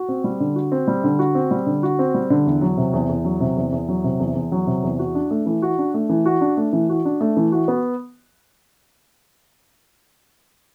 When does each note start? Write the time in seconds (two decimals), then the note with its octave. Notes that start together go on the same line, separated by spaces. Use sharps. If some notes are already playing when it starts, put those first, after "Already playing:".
Already playing: F#4
0.09 C4
0.24 G3
0.40 D3
0.56 F#4
0.72 C4
0.87 G3
1.04 D3
1.19 F#4
1.35 C4
1.51 G3
1.66 D3
1.83 F#4
1.99 C4
2.14 G3
2.30 D3
2.46 E2
2.61 F#3
2.77 C3
2.93 E2
3.09 E2
3.25 F#3
3.40 C3
3.57 E2
3.72 E2
3.88 F#3
4.04 C3
4.20 E2
4.35 E2
4.52 F#3
4.67 C3
4.83 E2
4.99 F#4
5.15 D4
5.31 A3
5.46 E3
5.62 F#4
5.78 D4
5.94 A3
6.09 E3
6.26 F#4
6.41 D4
6.57 A3
6.73 E3
6.89 F#4
7.05 D4
7.21 A3
7.37 E3
7.52 F#4
7.68 B3